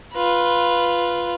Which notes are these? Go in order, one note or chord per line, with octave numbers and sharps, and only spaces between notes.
F4 B4